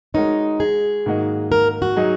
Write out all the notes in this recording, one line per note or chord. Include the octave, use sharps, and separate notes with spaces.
G#3 D#4 F#4 A#4 C#5
G#4
G#2 D#3 A#3 F#4 D#5
A#4
F#4
F#3 D#4 G#4 D#5